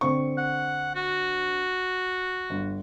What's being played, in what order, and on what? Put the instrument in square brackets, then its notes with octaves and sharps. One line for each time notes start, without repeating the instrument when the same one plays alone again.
[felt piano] D3 C4 C#6
[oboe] F#5
F#4
[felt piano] G1